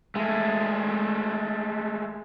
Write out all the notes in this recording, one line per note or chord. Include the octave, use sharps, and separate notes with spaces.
G#3 A3